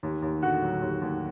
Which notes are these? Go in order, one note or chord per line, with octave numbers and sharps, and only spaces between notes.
D#2
D#2
D3 F#4
F#3
D#2
D#2